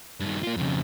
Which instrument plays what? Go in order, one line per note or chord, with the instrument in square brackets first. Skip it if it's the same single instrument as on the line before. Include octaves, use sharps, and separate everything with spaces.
[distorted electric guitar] G2 D#3
A#3 F4
F2 C#3